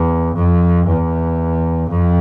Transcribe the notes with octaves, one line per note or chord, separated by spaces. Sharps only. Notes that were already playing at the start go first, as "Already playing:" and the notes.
Already playing: E2
F2
E2
F2